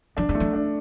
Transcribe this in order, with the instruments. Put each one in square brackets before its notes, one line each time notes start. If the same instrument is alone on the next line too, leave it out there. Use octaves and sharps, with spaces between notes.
[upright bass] F#3 [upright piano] D4
[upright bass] G#3
[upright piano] A3
[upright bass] F#3
[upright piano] D4